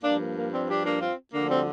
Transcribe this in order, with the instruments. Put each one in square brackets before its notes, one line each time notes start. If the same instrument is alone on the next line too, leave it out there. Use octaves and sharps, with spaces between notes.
[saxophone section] G2 F3 A#3 D4
A#3
A#3
G3 C4
D4 G4
A#3 D4
C4 F4
D2 D3 F3 A#3 D4
G3 C4